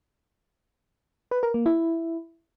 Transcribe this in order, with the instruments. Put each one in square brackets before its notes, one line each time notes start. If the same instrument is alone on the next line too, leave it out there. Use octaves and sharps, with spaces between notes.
[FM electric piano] B4
A#4
A#3
E4